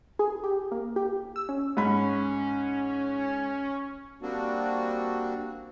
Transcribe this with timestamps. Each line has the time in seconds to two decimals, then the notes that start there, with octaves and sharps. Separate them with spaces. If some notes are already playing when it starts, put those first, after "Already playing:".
0.19 G#4
0.44 G4
0.72 A#3
0.96 G4
1.36 E6
1.49 C#4
1.77 G#2 C#4 B5
4.22 G3 A#3 C4 D4 F#4